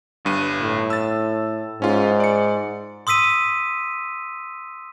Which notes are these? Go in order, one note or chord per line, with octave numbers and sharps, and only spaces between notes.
G1 G2 D#7
A2
E6 A6
G#2 C#4 F4
D5 C#7
C6 D#6 E6 B6 D#7